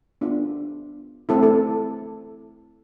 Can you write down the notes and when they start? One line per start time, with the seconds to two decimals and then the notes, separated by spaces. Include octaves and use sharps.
0.21 B3 D4 F4
1.29 A3 C4 E4 A4
1.43 A4